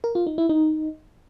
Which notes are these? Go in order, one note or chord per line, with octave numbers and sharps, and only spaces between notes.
A#4
F4
D#4
E4
D#4